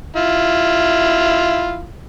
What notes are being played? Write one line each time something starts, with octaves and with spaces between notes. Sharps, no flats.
E4 F4